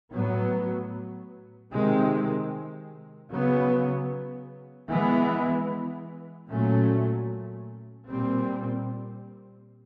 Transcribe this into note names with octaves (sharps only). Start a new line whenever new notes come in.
A2 F#3 B3
C3 D#3 G#3 C4
C#3 F#3 B3
E3 G#3 B3
A#2 F#3 A3 C#4
A#2 G3 C4